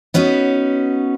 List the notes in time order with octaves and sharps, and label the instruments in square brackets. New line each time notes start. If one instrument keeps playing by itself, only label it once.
[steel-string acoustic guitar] B3 C#4 D#4 F#4 B4